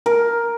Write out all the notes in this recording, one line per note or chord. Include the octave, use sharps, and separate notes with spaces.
A#4